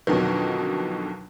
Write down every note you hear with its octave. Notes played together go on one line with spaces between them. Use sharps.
F2 B2 D3 D#3 F#3